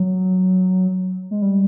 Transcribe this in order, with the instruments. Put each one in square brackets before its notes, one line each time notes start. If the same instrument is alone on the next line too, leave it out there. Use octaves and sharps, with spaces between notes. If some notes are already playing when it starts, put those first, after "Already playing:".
Already playing: [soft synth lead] F#3
G#3
G3